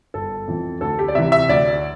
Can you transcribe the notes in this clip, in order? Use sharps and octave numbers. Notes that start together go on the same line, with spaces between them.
G1 A4
F2 E3
D2 A4
G4
D5
C3 E3 E5
E5
D2 D5